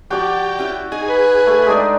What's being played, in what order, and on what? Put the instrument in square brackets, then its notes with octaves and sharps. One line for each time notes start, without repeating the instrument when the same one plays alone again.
[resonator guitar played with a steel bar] F3 [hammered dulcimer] F#4 D5 [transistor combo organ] G4
[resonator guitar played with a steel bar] C#4 E4
[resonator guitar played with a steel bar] D#4 [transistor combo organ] G#4
[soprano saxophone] B4
[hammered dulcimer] A3
[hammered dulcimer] G#3 D4 D#4 [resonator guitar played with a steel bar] D5 D#5